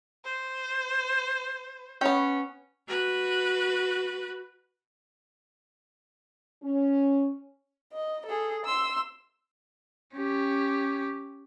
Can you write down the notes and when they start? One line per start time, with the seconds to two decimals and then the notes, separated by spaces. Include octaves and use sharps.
0.25 C5
2.01 B3 C#4 C#5 G5
2.88 F#4 B4
6.63 C#4
7.93 D#5
8.26 G#4 A4
8.65 C6 E6
10.13 C#4 G4